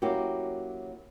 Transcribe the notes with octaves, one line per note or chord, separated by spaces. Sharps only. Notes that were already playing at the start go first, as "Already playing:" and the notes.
F#3 A#3 C#4 E4 F#4 G4